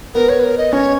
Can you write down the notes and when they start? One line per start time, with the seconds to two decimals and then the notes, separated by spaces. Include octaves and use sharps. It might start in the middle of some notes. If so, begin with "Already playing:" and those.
0.14 B3 A#4
0.29 C#5
0.40 B4
0.43 A#4
0.58 D#5
0.72 C#4 C#5